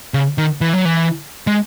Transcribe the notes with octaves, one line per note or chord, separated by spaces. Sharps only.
C#3
D#3
E3
F#3
E3
G#3